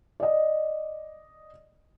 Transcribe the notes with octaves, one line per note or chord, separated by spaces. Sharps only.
D5 D#5